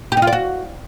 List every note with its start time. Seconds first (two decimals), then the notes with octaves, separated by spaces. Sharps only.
0.12 G4
0.17 D#4
0.22 F4
0.27 D5
0.33 F#4